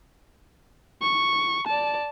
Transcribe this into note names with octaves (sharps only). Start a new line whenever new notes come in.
C#6
D5 A5